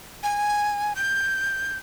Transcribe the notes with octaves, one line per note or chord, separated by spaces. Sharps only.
G#5
G6